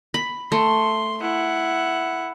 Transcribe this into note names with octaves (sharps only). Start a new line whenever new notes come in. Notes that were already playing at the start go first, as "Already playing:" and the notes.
B5
A3 C6
E4 F#5